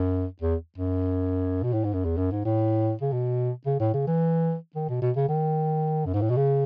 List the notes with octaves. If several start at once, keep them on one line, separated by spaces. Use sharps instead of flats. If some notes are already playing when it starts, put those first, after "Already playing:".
Already playing: F#2
E2
F#2
B2
A2
G#2
F#2
E2
F#2
G#2
A2
C#3
B2
C#3
A2
C#3
E3
D#3
B2
B2
C#3
D#3
F#2
G#2
A2
B2
C#3